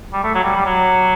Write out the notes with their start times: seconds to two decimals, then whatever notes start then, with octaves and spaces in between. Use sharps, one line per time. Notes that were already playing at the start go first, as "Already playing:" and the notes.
0.13 G3
0.24 A3
0.35 F#3
0.44 G3
0.55 G3
0.66 F#3